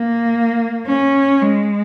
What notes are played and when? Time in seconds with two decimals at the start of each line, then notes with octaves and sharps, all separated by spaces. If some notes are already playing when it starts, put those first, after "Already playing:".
Already playing: A#3
0.86 C#4
1.41 G#3